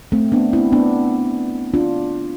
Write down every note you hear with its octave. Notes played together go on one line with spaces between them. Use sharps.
A3 C4
B3 D4
C4 E4
B3 D4
D4 F4